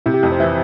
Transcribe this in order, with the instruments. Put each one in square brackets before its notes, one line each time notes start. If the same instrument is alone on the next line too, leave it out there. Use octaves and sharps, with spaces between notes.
[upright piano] C3 [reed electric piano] E4
[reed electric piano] G4
[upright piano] F2
[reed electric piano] C5
[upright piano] E3 [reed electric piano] E5